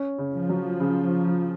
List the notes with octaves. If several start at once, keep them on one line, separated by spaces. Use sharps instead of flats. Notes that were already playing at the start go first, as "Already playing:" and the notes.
Already playing: C#4
C#3
F3
F#3
C#3